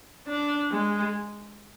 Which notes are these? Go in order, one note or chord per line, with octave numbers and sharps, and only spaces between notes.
D4
G#3